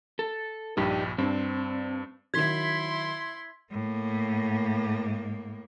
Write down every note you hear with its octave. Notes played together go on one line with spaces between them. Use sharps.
A4
A#1 G2 G3 D#4 G4
G2 C4 D4
D#3 F#3 E4 C6 G#6 B6
A2 A#3